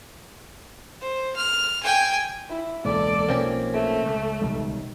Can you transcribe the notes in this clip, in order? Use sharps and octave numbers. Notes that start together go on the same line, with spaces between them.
C5
F6
G5 G#5
E4
E1 C#2 A#3 A4 D5
B1 F3 A#3 C4 C#4
A3
C#2
B1 D#3 G3